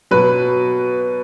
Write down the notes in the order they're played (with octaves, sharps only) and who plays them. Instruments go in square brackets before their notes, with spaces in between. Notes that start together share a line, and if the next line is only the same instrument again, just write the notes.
[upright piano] B2 F#3 B4